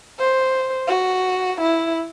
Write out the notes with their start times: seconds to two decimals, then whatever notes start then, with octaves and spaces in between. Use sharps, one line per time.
0.19 C5
0.87 F#4
1.61 E4